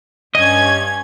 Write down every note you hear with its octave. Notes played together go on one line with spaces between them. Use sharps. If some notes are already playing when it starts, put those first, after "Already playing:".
G2 C#4 D#5 G#6